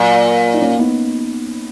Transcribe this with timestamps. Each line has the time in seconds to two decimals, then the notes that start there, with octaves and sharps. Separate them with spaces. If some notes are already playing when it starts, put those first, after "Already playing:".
Already playing: A#2 F#3 A#3
0.54 D#4
0.61 A#3 C#4
0.79 B3 D#4